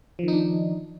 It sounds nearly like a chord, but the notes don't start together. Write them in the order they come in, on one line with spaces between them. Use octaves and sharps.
F3 D#3 D#4 D4